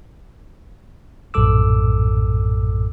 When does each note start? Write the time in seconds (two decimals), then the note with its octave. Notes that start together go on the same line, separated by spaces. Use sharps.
1.34 A#1 F#2 A2 A4 D6 E6